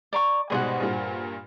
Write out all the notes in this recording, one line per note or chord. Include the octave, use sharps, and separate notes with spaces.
D5 A#5 C#6
G#2 B2 G3 G#4 C5 F#5
G2 A#2